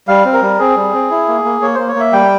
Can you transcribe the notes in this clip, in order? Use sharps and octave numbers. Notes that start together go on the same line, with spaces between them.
G3 F5
C4
A#4
G3
C4 G#4
G3
C4
E4
A#3
A#3
A#3 C#5
A#3 C5
C#5
A#3 E5
G3 G5